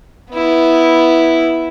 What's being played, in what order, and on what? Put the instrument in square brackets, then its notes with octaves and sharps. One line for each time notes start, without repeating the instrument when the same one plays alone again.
[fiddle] B3 E4